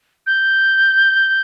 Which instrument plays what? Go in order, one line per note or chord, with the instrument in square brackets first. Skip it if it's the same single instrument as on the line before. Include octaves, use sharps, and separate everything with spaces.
[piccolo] G6